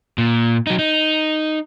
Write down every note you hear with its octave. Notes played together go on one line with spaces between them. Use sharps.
A#2
F#3 D#4
D#4